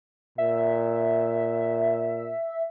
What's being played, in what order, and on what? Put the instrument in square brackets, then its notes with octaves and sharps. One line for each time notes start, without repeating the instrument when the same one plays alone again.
[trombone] A#2 [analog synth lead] E5